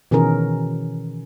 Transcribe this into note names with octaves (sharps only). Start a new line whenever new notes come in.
B2 D#3 E3 C#4 G#4 A#4